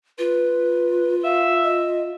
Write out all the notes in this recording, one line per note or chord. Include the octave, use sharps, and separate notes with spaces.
F4 B4
E5 F5
D#5